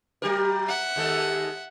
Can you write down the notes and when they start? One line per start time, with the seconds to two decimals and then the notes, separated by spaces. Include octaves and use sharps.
0.22 F#3 G4 A#4
0.67 E5 F#5
0.96 D#2 G#3 A4